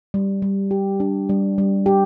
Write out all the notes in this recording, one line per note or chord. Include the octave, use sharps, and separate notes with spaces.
G3
G3
G4
D4
G3
G3
G4